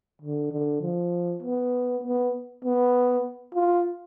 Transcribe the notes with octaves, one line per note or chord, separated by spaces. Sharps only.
D3
D3
F3
B3
B3
B3
F4